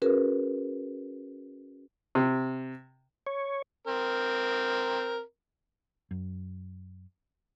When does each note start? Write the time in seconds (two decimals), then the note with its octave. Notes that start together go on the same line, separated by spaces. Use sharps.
0.02 C#4 F#4 G#4 A#4 B4
2.15 C3
3.27 C#5
3.87 C4 A#4
6.11 F#2